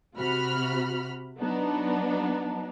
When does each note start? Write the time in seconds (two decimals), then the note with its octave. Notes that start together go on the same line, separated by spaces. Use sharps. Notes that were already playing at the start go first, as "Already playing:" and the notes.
0.18 C3 F#4 B5 F6
1.41 F#3 B3 D4 D#4